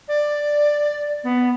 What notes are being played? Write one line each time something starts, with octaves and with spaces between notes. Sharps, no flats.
D5
B3